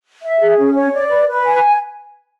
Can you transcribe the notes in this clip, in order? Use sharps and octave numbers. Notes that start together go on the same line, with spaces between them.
E5
G#4
C#4
C#5
D5
B4
B4
G#5